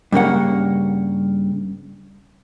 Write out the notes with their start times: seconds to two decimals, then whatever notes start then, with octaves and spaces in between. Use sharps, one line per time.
0.12 G2 C#3 A#3 F#5